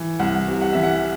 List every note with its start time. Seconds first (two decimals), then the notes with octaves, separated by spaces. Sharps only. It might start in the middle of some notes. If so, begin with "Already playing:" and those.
Already playing: E3
0.19 C2 F#5
0.48 C3
0.62 F#5
0.73 E3 E5
0.83 F#5